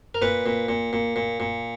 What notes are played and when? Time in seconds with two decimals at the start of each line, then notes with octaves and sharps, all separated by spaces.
0.15 A#4
0.22 A#2 B4
0.46 A#2
0.69 A#2
0.93 A#2
1.16 A#2
1.40 A#2